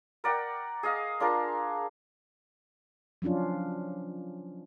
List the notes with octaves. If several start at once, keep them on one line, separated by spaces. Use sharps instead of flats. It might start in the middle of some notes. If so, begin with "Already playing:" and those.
A#4 D5 F#5 G5
G#4 D#5 F5
D4 F4 G#4 A#4
F3 F#3 C#4 D4 F4